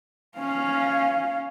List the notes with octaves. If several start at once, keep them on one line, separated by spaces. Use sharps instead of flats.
C#4 F5